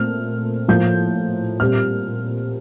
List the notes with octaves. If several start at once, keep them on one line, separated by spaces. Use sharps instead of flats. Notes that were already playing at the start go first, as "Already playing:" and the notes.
Already playing: A#2 A3 C4 F6
A2 F3 A#3 G6
A#2 G3 C4 F6